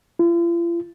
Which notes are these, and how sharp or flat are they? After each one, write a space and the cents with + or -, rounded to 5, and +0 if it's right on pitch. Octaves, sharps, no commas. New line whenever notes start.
F4 -45